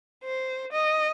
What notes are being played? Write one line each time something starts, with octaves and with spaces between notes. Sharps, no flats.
C5
D#5